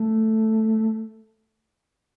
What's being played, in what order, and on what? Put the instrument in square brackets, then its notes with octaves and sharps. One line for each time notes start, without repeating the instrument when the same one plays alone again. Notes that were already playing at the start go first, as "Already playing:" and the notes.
Already playing: [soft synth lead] A3